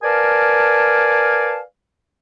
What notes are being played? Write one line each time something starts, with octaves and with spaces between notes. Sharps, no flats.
A#4 B4 D5 F5 G#5 A5